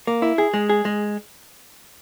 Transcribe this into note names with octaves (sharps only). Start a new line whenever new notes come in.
A#3
E4
G#4
G#3
G#4
G#3